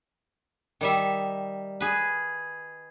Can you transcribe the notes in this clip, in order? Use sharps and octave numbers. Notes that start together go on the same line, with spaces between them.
D#3 G3 E5
G#4 B4